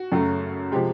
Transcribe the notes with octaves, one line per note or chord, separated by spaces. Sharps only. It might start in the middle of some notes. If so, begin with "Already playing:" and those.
Already playing: F#4
F#2 C#3 F#3 A3
C3 F3 G#3 G4